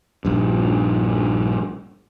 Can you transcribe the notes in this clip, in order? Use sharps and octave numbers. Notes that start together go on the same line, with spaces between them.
A#1 G2